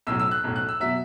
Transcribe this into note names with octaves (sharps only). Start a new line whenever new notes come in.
B1 A2 F#3 E6
E6
F#6
B1 A2 F#3
F#6
E6
B2 F#3 E5